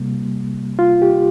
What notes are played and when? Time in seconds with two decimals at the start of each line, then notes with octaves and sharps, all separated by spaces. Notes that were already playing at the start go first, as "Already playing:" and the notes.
Already playing: C3 G3 A#3
0.79 F4
1.02 G4